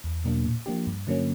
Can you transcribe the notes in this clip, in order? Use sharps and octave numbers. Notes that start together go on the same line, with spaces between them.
E2
B2 F#3 A#3 D4
A#2
F3 A#3 D4 G4
G2
D3 F#3 A#3 C#4